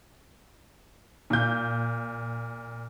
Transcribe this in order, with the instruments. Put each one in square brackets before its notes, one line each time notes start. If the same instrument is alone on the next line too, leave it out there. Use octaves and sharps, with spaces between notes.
[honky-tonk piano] A#2 G6